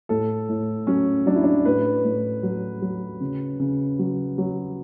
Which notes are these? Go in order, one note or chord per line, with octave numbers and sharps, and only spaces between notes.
A2 A4
A2
F#3 C#4
F#3 D4
E4
D4
A2 B4
A2
F#3
F#3
C#3
C#3
F#3
F#3